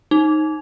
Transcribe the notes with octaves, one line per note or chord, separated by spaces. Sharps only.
D#4